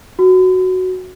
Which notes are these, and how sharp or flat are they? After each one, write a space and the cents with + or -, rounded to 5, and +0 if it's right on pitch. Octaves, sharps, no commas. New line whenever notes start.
F#4 +0